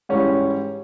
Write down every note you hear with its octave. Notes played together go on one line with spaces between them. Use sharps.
G#2 E3 G3 C#4